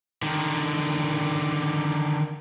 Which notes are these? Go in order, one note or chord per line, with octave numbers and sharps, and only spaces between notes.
D3 D#3